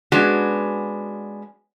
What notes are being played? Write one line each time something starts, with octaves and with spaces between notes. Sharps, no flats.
G#3 B3 C#4 D4 F#4